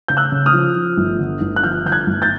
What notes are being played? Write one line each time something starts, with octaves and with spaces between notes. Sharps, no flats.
C#3 G6
E6 F#6
C#3
D#6 F6
F3
F3
G1
D3
G1
F#6
F3 F6 G6
D3 G6
F#6 G#6
G1
G6 A6